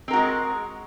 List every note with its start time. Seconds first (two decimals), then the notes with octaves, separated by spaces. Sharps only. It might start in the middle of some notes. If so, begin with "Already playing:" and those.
0.08 C4
0.11 A#4
0.13 F#4
0.16 G#3